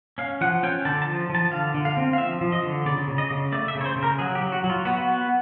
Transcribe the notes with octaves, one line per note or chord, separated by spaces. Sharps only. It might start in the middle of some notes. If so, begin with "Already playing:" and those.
C#4 F5
F3 F#5
C#4 G5
D3 A5
A5
F3
F3
A5
D3 F5
D3
F5
C4
F5
F3 E5
F3
D#5
D3
C#3 D5
C#3
D#5
C#3
A3 D5
E5
C#3
C#5
C5
C#3
A#4
F#3 G#4
G4
F#3
F#4
F#3
F4
B3 F#4
B3